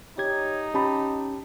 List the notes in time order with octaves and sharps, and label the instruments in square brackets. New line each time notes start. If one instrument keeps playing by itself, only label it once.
[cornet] D#4 [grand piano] G4 [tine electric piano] C#5 G#6
[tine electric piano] C#4 [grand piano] G4 A5 B5